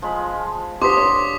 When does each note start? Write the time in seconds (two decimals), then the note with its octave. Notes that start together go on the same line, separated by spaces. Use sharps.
0.02 F3 G#3 B5
0.82 D3 F4 G4 C5 C6 D6 D#6 B6
0.97 C#5